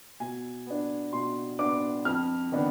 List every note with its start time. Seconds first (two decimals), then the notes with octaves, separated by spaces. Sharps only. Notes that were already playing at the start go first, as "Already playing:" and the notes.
0.20 B2 G#5
0.67 B3 D4
1.12 B2 C6
1.59 B3 D4 D6
2.05 F2 F6
2.52 D#3 B3 D4